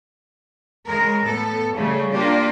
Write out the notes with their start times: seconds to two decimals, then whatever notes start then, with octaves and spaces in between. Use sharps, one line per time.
0.86 C#3 G#3 A#4
1.25 A2 B3 A4
1.74 C#3 G3 A3
2.12 A#3 D4 F4 G4